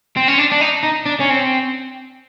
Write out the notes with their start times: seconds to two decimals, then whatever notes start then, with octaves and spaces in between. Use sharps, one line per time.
0.17 C4
0.28 C#4
0.39 D4
0.52 D4
0.61 D#4
0.83 D#4
1.06 D4
1.21 C#4
1.30 C4